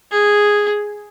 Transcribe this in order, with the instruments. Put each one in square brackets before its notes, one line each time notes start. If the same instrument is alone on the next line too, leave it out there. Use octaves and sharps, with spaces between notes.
[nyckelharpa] G#4